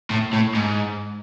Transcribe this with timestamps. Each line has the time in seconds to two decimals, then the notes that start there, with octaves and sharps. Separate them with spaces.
0.10 A2
0.33 A2
0.55 G#2